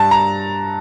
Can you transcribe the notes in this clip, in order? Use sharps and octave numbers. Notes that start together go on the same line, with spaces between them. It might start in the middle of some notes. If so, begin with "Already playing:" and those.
Already playing: G2 A5
A#5